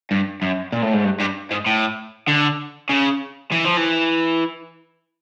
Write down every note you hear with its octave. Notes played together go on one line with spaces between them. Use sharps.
G2
F#2
A#2
A2
G#2
G2
G2
G#2
A2
D3
C#3
E3
F3
E3